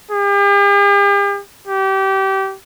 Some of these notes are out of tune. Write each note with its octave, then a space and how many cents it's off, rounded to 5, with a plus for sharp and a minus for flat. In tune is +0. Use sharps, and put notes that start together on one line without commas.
G4 +45
G4 -25